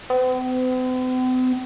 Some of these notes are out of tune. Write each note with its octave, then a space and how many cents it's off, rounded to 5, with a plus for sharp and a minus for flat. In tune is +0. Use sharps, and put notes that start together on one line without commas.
C4 -45